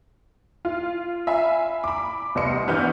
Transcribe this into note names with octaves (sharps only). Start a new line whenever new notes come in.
F4
E5 F5 G#5 B5
B5 D6
C2 B3 D#5 C6 C#7
G2 E3 B3 F6 G6